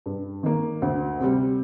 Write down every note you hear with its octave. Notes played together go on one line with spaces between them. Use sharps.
G2
D#3 A#3
D2
C3 G3